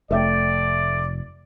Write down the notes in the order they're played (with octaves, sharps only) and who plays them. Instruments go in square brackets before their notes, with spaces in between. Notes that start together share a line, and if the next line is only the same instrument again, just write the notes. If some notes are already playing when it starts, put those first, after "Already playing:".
[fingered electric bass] F1 [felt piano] A3 E5 G5 [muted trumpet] D5